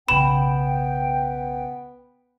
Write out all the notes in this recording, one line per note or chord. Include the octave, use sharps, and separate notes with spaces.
B1 C#3 B3 G5 B5 E7